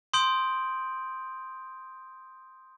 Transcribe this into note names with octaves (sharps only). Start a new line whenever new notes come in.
C6 D#6 G6 D7 F#7